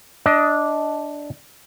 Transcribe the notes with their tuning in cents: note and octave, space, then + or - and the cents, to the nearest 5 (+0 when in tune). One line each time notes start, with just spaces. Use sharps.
D4 +0 D#5 +20